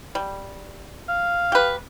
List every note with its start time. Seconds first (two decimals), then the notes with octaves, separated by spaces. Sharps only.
0.15 G3
1.09 F5
1.52 G4 B4